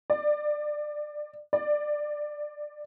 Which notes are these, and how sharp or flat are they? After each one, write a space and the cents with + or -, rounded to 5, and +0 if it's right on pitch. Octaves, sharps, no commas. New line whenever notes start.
D5 +20
D5 +15